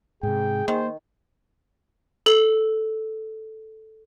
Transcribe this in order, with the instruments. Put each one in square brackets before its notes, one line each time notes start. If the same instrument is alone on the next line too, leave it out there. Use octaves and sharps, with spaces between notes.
[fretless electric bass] G#2 C3 [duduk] G#4 [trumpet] G5
[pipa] D#3 [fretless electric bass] A#3 [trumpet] C5
[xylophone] A4 F#7